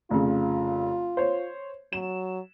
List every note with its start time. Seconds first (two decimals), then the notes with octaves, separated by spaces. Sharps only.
0.10 F1 C#3 F4
1.17 C5 C#5
1.93 F#3 E7